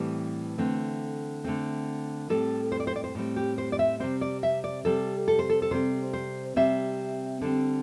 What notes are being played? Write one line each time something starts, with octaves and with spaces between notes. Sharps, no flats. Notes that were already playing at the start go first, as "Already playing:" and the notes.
Already playing: A2 E3 G3 C4
D3 A3 C4
D3 A3 C4
A2 G3 C4 A4
C5
D5
C5
D5
C5
A2 G3 C4
G4
C5
D5
E5
C3 G3 C4 C5
D5
E5
D5
C3 G3 C4 A4
A4
C5
A4
A4
C3 G3 C4 C5
C5
C3 G3 C4 E5
D3 G3 C4